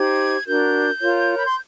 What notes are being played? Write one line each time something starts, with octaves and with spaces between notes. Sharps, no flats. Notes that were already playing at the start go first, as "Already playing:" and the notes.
Already playing: D#4 G4 C5 G#6
D4 F#4 A#4 G6
F4 A#4 C#5
B5
C6